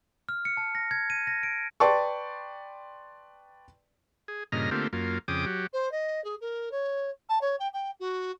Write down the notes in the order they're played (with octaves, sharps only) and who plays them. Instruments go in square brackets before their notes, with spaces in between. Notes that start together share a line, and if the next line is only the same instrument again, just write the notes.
[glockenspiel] F6
C#7
A5
A#6
G#6
D#7
A#6
D7
[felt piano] B4 D5 G5 A5 C6 C#6
[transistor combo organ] G#4
G2 A#2 C#3 D#5 A#5 F6
D3 A3 A#3 C4 F4 G4
F#2 A#3 F4
F2 C#3 G5 D6 D#6
F#3 G4
[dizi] C5
D#5
G#4
A#4
C#5
A5
C#5
G5
G5
F#4